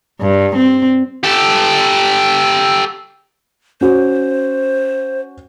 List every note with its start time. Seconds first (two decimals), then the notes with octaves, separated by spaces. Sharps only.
0.21 G2
0.56 C4
1.23 G4 A4
3.81 C#4 F#4 C5